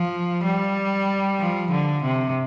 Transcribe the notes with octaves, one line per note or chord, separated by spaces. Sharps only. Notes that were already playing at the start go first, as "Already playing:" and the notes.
Already playing: F3
G3
F3
D3
C3